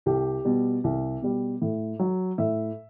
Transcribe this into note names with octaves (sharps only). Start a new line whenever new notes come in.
C2 G4
B2 G3
C2
B2 G3
A2
F#3
A2 E5